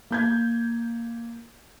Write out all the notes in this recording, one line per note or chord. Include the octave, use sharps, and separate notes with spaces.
A#3 G6 G#6